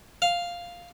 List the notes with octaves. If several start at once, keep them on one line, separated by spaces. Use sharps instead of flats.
F5